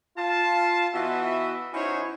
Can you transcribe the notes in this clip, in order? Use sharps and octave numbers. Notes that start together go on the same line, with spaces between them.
F4 A5
E3 B3 F#4 D#5 E5
C#4 D#4 E4 F#4 C5 C#5